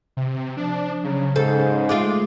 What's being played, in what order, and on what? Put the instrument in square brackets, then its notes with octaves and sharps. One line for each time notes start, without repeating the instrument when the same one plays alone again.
[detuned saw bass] C3
[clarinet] F3 [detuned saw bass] D4
[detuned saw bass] C#3 [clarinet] F#3
[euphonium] G#2 [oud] A4 [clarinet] C5
[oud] G#3 A3 F4 [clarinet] D6